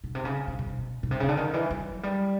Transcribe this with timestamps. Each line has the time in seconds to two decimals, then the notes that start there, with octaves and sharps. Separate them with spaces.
0.04 B2
0.15 C3
0.25 C#3
0.47 B2
0.59 B2
0.70 B2
1.03 B2
1.11 C3
1.20 C#3
1.29 D3
1.37 D#3
1.53 E3
1.70 F#3
2.03 G3